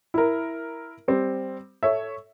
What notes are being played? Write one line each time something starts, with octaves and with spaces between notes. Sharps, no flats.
E4 A#4
G3 C4
A4 C#5 E5